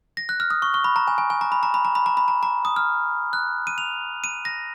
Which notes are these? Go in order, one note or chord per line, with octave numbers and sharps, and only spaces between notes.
A#6
F#6
F6
D#6
C#6
C#6
B5
A#5
G#5
G#5
G#5
A#5
B5
A#5
B5
A#5
B5
A#5
B5
A#5
A#5
D#6
F6
F#6
D#7
F7
D#7
A#6